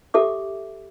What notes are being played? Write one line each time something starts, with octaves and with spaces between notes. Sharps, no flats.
G4 A4 E5 D6